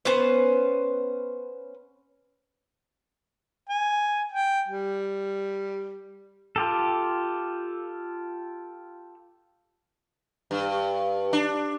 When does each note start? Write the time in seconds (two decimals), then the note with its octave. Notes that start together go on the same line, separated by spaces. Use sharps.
0.05 B3 C#4 B4 C5
3.69 G#5
4.32 G5
4.68 G3
6.56 F4 G4 A4
10.51 G2
11.33 D4